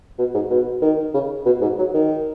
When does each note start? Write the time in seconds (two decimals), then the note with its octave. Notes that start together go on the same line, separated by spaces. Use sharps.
0.18 B2
0.34 G#2
0.50 B2
0.82 D#3
1.14 C#3
1.45 B2
1.61 G#2
1.78 F#3
1.94 D#3